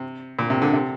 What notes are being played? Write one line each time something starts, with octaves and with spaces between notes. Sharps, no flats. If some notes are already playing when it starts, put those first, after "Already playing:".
Already playing: C3
A#2
C3
D3
C3